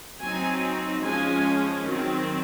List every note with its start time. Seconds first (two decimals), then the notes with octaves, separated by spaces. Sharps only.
0.22 F#3 C4 D#4 G#5
1.04 F3 G#3 C#4 G#5
1.88 D#3 F#3 C4